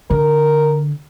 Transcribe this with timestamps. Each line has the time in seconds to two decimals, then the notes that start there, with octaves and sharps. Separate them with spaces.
0.10 D3 A#4